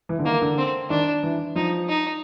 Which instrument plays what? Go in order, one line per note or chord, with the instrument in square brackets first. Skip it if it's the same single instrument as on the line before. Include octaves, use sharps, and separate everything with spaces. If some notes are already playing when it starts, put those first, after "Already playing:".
[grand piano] E3
D3
[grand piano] D#3 [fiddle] A#3
[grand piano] D3
[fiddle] C4
[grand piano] D#3 [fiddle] D4
[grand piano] E3
[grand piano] F3 [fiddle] D#4
[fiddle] D#4